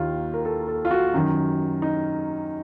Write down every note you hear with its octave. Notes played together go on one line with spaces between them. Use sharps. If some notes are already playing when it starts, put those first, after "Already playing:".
Already playing: D#2 D#3 F4
A#4
A4
A4
F4
F#4
F#2 D#3
D#4